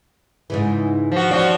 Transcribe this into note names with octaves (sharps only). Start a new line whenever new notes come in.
G#2 C#3 E3
F3 F#4
D#2 F3 C#4 F#4 D5